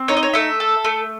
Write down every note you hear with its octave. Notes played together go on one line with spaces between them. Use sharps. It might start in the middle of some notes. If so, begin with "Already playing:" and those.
Already playing: C4
D#4 C#5
D#5
C#5
A3 E5
A4
A3